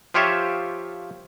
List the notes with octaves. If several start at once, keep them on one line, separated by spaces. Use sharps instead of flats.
F3 F4 G4 C5 C#5 E5